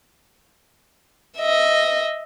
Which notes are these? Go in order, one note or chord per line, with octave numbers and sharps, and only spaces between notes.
D#5 E5